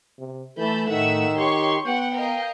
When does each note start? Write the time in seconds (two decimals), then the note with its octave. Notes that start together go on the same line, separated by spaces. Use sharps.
0.19 C3
0.58 E3 A3 A5 B5 G6
0.89 A2 D#3 A3 E5 F#5 E6
1.36 G4 C#5 C6 C#6
1.86 B3 F#5 G5
2.16 A#4 D#5 F5